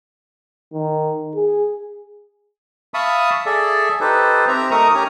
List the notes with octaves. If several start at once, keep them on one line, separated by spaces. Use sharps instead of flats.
D#3
G#4
E5 F5 A5 B5 C#6 D#6
G#4 A4 D5 E5
D#4 G4 A4 B4 C5
C4 G4 E5 A#5
A3 D#4 A#4 A#5 C#6 D#6
C#4 G4 G#5 A#5